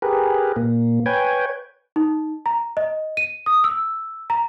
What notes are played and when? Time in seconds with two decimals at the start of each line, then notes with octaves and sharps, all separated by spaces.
0.02 G4 G#4 A#4 B4
0.56 A#2 A#3
1.06 B4 C#5 G5 G#5
1.96 D#4
2.46 A#5
2.77 D#5
3.17 D#7
3.46 D#6
3.64 E6
4.30 A#5